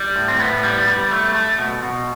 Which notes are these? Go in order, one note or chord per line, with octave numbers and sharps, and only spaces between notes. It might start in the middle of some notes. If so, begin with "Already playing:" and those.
Already playing: G3
A2
C4
A2 B3
G3
G3
A3
A3
B2
B2